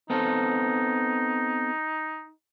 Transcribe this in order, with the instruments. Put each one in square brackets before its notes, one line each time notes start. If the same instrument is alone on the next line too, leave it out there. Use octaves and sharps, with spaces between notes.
[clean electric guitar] B3 C4 A4 [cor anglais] D#4